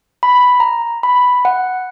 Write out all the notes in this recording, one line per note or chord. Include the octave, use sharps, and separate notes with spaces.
B5
A#5
B5
F#5